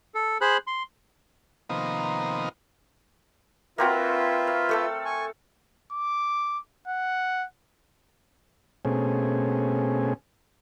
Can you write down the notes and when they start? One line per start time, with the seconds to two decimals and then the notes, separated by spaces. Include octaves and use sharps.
0.15 A4
0.41 G#4 C5 B5 F#6
0.67 C6
1.69 C3 D#3 F3 A#3 B3 D#4
3.78 A#3 C4 F4 F#4 B4 E5
4.47 F5
4.69 A3 A4 E6
5.05 G#5 C#6
5.92 D6
6.88 F#5
8.85 B2 A3 C4 C#4 G#4